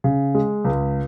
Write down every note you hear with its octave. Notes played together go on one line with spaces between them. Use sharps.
C#3
G#3
C#2